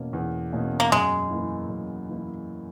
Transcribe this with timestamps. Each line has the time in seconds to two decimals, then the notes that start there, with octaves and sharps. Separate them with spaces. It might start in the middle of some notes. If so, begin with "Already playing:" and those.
Already playing: E2 B2 A#3 C#4
0.13 E2
0.53 B2 A#3 C#4
0.80 A#3
0.92 F#2 G#3
1.30 E3 A#3 E4
1.70 F#2
2.09 E3 A#3 E4